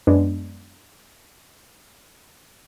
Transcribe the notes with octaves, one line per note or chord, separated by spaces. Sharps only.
F#2 G#3 B3 D4